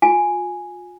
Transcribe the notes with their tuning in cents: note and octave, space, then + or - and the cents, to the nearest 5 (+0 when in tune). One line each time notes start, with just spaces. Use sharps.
F4 +35 G#5 +0